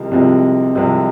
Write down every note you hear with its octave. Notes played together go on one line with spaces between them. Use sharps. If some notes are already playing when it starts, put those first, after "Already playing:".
Already playing: C2 C3 F3 G#3
C2 C3 F3 G#3
C2 C3 F3 G#3